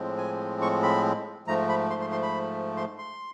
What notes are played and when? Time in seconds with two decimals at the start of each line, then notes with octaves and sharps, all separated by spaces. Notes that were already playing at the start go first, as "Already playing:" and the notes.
Already playing: A2 F3 G#3 C4
0.18 G#5
0.62 C#6
0.83 B5
1.47 G#2 F3 A3 A#5
1.69 B5
1.90 C6
2.01 C6
2.12 C6
2.22 B5
2.77 C6
2.98 C6